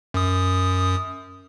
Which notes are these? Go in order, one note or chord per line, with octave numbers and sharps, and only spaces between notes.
F#2 D#6